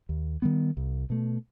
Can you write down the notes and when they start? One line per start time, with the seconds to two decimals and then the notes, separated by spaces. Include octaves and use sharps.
0.09 D#2
0.42 D#3 G3 B3
0.77 C2
1.10 B2 A3